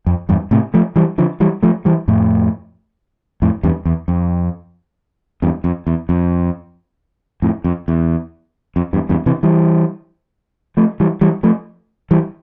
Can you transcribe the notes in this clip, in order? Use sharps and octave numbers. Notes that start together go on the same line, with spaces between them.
F2
E2 G2
A2 C3
F3 A3
E3 G3
D3 F3
E3 G3
F3 A3
E3 G3
F2 A2
F2 A2
E2 G2
E2
F2
E2 G2
F2
E2
F2
F2 A2
F2
E2
F2
E2 G2
E2 G2
C3 E3
E3 G3
F3 A3
E3 G3
E3 G3
F3 A3
E3 G3